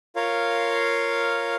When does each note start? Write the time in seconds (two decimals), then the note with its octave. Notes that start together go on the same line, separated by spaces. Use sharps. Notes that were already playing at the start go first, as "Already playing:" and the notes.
0.16 F4 A#4 C#5 F5